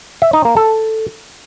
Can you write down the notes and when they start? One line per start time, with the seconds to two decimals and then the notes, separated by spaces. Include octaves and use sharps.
0.22 E5
0.33 D#4
0.45 A#3
0.57 A4